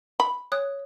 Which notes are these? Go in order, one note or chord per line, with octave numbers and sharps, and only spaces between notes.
B5
C#5 D#6 F#6